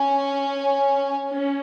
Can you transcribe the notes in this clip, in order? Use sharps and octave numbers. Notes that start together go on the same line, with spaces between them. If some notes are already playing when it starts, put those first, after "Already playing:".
Already playing: C#4
C#4